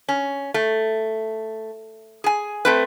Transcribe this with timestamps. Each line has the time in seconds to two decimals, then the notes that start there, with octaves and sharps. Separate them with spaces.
0.09 C#4
0.54 A3
2.24 G#4 G#5
2.65 A3 C4 B4